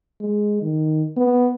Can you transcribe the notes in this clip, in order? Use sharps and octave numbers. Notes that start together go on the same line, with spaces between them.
G#3
D#3
B3